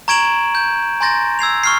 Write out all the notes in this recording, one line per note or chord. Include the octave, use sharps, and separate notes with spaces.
A#5 C#6 G#6 D7 E7 F#7
G6
G#5 A#5 C6 G6 A6 A#6
E6 G#6 C7 F7
C#6 F6 C7